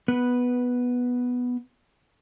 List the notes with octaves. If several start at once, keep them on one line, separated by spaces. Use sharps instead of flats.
B3 B4